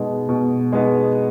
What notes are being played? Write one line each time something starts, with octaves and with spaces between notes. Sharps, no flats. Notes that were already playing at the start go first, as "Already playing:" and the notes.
Already playing: B2 G#3 B3 D#4
B2
G#3 B3 D#4